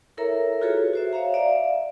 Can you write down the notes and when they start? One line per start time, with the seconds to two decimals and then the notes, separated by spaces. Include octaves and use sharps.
0.17 E4 A4 A#4 C#5 E5 A#5
0.61 F4 F#4 G#4 A4 B4 C#5
0.93 F#4 C5 E5
1.13 C#5 E5 F5 A#5
1.34 D5 E5 F5